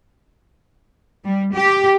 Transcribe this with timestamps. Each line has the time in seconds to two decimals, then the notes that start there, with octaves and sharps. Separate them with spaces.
1.24 G3
1.54 G4